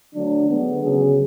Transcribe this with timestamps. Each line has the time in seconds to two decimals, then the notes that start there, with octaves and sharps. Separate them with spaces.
0.14 D3 F#3 A3 D4
0.49 D3 G#3 B3
0.83 C#3 F#3 C#4 G#4